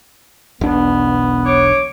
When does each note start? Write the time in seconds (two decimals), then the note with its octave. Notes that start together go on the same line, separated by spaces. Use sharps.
0.61 E1 B1 B3 D4
1.46 C#5 D6